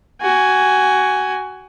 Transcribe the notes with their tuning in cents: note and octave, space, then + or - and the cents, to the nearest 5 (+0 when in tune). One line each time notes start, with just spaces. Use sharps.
F#4 +20 G#5 +0